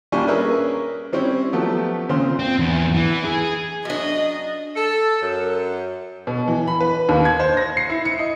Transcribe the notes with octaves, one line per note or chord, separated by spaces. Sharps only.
A#1 G3 D4 G#5 C#6
A#3 C#4 G#4 A#4 B4 E5
G3 C4 C#4 E4
F3 F#3 A3 B3 G4
A#2 C#3 C4 C6
C4
E2
E3
G#4
F#2 D4 D#5
A4
F#2
B2
E3
B5
B4
D#2
G#6
C5
A#6
C7
E4
C#7
D#5